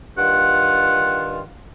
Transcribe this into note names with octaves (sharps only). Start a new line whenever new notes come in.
G2 D#3 F4 F#5